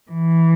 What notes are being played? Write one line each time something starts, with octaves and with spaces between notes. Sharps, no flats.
E3